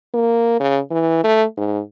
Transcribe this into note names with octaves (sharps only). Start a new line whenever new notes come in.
A#3
C#3
E3
A3
G#2